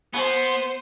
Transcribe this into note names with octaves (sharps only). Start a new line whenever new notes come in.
B3 C5